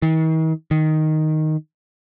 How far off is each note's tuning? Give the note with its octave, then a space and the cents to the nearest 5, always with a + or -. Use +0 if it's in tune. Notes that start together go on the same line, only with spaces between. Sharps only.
D#3 +45
D#3 +0